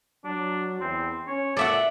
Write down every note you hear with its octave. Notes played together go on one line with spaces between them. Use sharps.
F#3 D4
E2 C4
C#4 C#5
A#2 A4 D5 E5 F#5